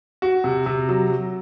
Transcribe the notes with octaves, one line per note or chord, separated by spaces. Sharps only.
F#4
C3
C3
F#3
F#3